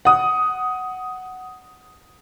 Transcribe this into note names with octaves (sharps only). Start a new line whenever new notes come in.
F#5 D#6